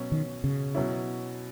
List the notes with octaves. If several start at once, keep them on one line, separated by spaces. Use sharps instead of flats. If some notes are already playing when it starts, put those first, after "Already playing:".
Already playing: B2 F#3 C#4
D#3
C#3
B2 F#3 C#4 E4